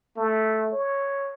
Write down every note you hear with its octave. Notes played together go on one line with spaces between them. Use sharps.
A3
C#5